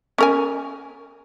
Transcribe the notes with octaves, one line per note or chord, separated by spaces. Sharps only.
C#4 A#4 G#5